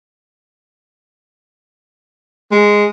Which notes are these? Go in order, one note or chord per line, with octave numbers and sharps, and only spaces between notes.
G#3